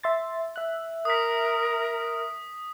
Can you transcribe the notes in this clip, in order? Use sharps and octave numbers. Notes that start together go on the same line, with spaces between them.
E5 C6 A6
E5 F#6
A#4 D#6 B6